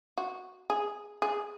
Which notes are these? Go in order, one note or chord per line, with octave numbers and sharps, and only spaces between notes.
F#4
G#4
G#4